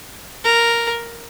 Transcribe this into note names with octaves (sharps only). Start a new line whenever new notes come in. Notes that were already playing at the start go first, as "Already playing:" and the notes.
A#4